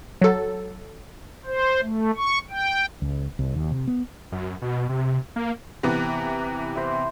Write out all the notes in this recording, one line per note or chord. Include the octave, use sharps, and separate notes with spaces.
F#3 A4
C5
A3
C#6
G5
C#2
C2
D#2
C3
B3
F#2
B2
C3
A#3
C3 E3 B3 B4 A5 A#5
E4 C5